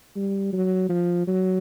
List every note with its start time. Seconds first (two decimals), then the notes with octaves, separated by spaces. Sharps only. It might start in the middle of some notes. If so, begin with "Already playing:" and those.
0.16 G3
0.53 F#3
0.89 F3
1.27 F#3